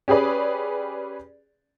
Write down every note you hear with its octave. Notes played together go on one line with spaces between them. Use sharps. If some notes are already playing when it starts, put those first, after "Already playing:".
C#4 G4 G#4 B4 D5